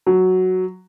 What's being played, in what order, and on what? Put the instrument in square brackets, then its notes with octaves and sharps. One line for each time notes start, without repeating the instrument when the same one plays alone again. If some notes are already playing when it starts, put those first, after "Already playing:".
[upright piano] F#3